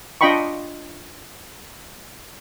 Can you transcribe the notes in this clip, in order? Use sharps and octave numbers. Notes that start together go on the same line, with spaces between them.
D4 F4 D#5 G5 B5 C#6